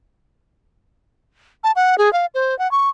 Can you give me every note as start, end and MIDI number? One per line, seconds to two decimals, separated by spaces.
1.64 1.72 81
1.76 1.98 78
1.98 2.11 68
2.13 2.26 77
2.35 2.57 72
2.59 2.70 78
2.71 2.89 85